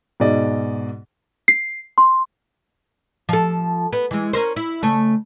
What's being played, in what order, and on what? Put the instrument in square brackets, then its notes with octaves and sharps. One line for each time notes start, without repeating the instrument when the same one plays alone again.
[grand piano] G#2 B2 G#4 D5 D#5
[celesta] C7
C6
[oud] F3 A4
B3
E3 G#3
C#4 A#4 C5
E4
C#3 A3